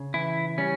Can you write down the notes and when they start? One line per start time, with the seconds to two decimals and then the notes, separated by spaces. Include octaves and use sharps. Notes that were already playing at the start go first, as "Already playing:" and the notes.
Already playing: C#3
0.14 E3 E4
0.58 G3 C#4